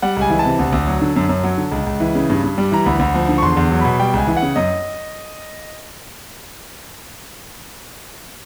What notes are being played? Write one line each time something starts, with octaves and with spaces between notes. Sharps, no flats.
G3 F#5
C#2 G#5
E3
A5
C3
D2
D2
F#3
D3
F#2
F#2
F#3
D3
C#2
C#2
E3
C#3
G2
G2
G3
E3 A#5
D2 B5
D2
F3
D3
C#6
E2 C6
E2
F#3
B2 B5
G3 G5
C#2 G#5
E3
F#5
C#3
F#2 D#5